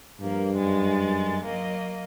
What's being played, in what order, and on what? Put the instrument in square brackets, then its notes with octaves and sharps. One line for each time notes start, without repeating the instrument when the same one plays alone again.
[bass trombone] G2 [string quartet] F3 A#3 A#4
[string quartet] F#2 G#3 A6
F#3 A#3 D#5